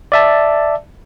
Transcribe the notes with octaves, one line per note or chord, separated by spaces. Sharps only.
D5 E5 A5